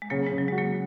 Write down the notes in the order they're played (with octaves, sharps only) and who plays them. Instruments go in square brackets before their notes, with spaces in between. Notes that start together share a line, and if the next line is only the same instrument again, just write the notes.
[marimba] G#3
[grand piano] C#3 [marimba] F#3 A#3
[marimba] G#3
[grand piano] C#3
[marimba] F#3
[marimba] G#3 [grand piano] F#4
[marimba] F#3 A#3